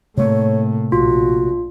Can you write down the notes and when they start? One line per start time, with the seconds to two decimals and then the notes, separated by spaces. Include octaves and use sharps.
0.17 A2 C3 A3 A#3 C#5
0.92 A#1 F4 F#4